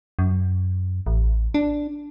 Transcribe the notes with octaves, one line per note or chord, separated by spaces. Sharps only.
F#2
A1
D4